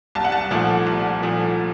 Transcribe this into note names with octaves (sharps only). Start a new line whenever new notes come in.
C2 A5
F#5
A5
A#2 F3 A3
C2
A#2 F3 A3